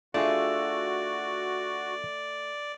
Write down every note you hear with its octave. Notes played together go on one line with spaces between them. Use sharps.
A3 D4 F4 F#4 G#4 D5